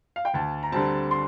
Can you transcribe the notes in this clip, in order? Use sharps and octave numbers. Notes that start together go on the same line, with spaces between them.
F5
G5
D2 A5
A#5
D3 G3 C4 A5
C6